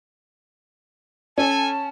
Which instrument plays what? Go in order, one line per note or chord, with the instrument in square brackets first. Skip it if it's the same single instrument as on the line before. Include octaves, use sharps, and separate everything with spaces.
[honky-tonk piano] C#4 [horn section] A4 G#5 [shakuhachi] A5